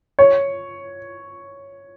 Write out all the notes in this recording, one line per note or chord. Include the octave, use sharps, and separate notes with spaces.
C#5